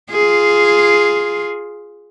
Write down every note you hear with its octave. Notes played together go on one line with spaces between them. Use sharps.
F4 G#4